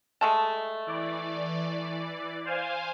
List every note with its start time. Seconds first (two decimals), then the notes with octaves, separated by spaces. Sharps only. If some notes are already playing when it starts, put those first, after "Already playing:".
0.21 G#3 A3 A5
0.87 E3 D5
2.45 C5 F5 G#5